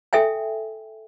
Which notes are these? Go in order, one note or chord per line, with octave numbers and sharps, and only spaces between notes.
A4 E5 G5 G#5